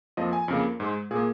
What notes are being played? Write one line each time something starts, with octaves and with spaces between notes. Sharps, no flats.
F2 F3 A#3 D#5
G#5
F2 C#3 A#3
G#2 G#3
A#2 A#3 G#4